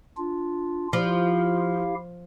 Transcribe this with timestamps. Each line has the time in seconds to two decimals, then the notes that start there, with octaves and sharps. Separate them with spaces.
0.17 D4 F4
0.93 F3 E4 G4 F5